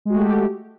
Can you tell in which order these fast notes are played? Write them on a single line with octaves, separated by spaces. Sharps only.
G#3 F#4 A3 G4